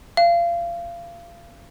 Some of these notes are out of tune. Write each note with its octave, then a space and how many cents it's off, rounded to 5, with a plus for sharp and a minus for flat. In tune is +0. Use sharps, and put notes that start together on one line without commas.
F5 -30